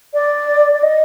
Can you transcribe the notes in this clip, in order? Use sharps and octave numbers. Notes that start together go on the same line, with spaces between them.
D5
D5
D#5